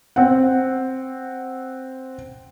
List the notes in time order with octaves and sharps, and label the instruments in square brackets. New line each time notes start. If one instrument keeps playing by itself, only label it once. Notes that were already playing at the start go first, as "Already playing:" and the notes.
[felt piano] C4 F#5